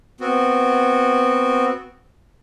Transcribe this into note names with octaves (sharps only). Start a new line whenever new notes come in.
B3 C4 F#4